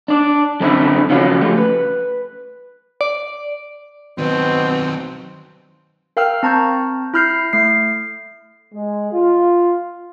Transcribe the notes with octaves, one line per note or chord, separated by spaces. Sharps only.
D4 D5
F#2 D3 C4 D#4 E4
C#3 F3 C#4 F#4 F5
F3 A3 G4
B4
D5
B2 D#3 F#3 C4
A#4 F5 G5 E6 F6
C4 A5 A#5 C#6 G6
E4 B5 F6 G6 C7
A3 C7
G#3
F4